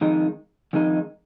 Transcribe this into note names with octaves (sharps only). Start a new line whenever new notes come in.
F2 D#3 G#3 D#4
F2 D#3 G#3 D#4